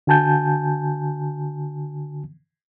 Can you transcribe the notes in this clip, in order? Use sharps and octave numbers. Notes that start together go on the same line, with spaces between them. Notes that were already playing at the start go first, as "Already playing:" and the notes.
D3 F#4 G#5 A5 G6